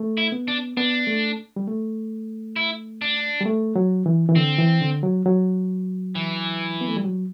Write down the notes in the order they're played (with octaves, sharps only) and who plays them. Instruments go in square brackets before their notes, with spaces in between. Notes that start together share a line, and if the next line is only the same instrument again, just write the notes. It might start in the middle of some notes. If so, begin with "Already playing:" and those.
Already playing: [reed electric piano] A3
[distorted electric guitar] E4
[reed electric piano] B3
[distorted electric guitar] D4
[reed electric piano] B3 [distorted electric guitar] D4
[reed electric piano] A3
G3
A3
[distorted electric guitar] E4
D4
[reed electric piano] G3
A3
F#3
E3
E3
[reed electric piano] D3 [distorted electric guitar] C4
[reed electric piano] E3
D3
F#3
F#3
[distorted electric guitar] E3
[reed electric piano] B3
A3
G3
F#3